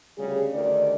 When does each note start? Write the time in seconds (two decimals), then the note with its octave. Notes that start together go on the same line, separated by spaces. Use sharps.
0.17 D2 C#3 G3 G#4
0.53 D2 D#3 G#4 D5